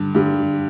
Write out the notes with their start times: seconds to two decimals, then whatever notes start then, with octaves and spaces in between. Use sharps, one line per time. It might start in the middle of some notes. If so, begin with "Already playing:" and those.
Already playing: G2 D3
0.15 G2 D3 G3